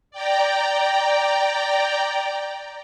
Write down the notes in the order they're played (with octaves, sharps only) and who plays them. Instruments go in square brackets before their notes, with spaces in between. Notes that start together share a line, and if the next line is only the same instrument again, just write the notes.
[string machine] D5 G5 A#5